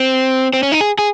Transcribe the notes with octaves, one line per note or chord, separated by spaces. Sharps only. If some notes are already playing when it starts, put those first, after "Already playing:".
Already playing: C4
C4
C#4
D#4
G#4
G#4